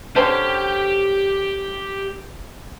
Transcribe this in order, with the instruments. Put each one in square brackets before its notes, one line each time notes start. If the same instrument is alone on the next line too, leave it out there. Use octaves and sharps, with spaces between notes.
[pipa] D3 C4 C#4 [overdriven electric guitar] G4 G5